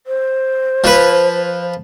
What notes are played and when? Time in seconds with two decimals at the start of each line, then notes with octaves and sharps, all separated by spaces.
0.07 C5
0.84 F3 B4